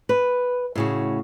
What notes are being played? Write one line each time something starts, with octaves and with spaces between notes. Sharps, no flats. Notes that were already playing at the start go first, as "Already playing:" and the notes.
B4
A2 C#3 F#4